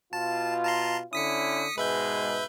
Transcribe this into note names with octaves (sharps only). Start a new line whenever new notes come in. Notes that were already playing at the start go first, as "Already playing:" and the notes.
B2 F4 A5
A5 A#5 C6
D3 C#4 E4 D#6 B6 C#7
G#2 B2 G#3 B4 E5 G6